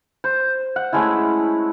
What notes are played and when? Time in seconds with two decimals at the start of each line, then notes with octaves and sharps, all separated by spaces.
0.24 C5
0.76 F#5
0.93 G#3 A3 C#4 E4